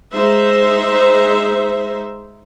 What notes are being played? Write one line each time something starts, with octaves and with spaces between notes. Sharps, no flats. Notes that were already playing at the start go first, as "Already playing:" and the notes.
G#3 D#4 C5 E5